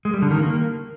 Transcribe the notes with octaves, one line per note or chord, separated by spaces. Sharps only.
G#3
G3
D3
D#3
A#3